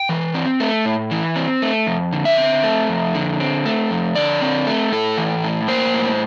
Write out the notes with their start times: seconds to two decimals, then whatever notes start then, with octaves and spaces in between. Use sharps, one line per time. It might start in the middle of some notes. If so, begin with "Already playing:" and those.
Already playing: G5
0.09 E3
0.34 C4
0.60 A3
0.85 A2
1.11 E3
1.36 C4
1.62 A3
1.87 F2
2.13 D3
2.25 E5
2.38 C4
2.64 A3
2.89 F2
3.15 D3
3.40 C4
3.66 A3
3.91 F2
4.15 D3 D5
4.42 C4
4.67 A3
4.92 A2 A4
5.17 E3
5.44 A2
5.68 A#3 C5
5.94 A2